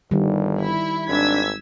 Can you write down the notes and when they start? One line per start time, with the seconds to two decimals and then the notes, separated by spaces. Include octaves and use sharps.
0.11 G1 D#3 G3
0.58 E4
1.09 G#1 D4 E6 G#6 B6